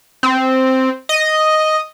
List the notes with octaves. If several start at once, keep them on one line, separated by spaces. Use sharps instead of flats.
C4
D#5